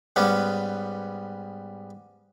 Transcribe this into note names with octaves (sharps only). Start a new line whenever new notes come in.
G#2 G3 B3 C#4